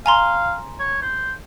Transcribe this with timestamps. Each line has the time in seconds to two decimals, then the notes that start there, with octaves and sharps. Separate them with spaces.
0.06 F5 G#5 A#5 C6
0.80 C#5
1.02 C5